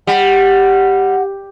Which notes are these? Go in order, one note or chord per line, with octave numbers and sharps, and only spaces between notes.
G3 F#5